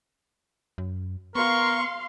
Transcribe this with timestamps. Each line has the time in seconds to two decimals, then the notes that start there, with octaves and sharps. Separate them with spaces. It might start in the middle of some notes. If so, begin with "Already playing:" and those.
0.78 F#2
1.35 B3 A#4 F5 C6 C#6